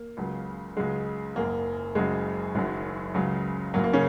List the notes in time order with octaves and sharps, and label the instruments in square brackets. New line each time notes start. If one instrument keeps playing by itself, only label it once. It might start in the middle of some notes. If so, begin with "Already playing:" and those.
Already playing: [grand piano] A#3
C#2 C#3 F#3
C#2 C#3 F#3 G#3
F#1 F#2 F#3 A#3
F#1 F#2 C#3 F#3 G#3
F#1 F#2 D#3 F#3
C#2 C#3 F#3
F#1 F#2 F#3 A#3
A#3
C#3 C#4